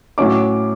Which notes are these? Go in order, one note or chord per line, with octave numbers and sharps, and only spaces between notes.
A2 F#3 C#4 D6